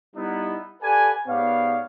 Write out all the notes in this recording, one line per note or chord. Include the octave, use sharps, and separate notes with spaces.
G3 B3 D#4 E4
G4 A4 B4 D5 F#5 G#5
G#2 B3 G4 C#5 D5 F5